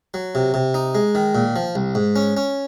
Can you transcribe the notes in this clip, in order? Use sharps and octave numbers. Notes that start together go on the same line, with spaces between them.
F#3
C3
C3
D#4
G#3
D#3
A#2
F3
C2
G#2
C#4
C#4